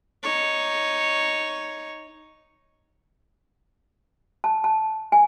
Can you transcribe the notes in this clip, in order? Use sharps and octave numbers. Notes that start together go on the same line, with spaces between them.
D#4 C#5
A5
A5
G#5